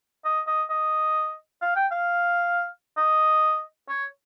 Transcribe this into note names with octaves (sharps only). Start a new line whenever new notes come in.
D#5
D#5
D#5
F5
G5
F5
D#5
C#5